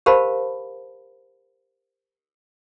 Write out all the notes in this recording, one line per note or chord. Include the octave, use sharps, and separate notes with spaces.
G4 A#4 C5 F5 A5 B5